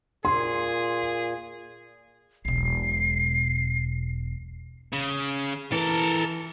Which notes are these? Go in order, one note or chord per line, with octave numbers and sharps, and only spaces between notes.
A#2 G#4 C6
E1 B1 C7
C#3
E3 A4 A#4